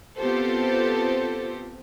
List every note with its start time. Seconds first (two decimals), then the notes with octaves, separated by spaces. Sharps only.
0.18 B3 C4 F4 G4 A4 C5